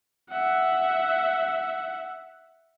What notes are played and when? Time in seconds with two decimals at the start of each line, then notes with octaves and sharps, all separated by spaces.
0.29 E5 F#5